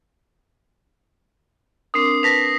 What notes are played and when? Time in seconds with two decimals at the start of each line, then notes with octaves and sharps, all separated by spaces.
1.94 C4 D4 A#4 D#6 C7
2.23 B4 A5 A#6 B6 F7